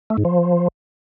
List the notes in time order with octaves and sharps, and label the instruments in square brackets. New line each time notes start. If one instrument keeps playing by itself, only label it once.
[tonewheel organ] A3
G#2
F3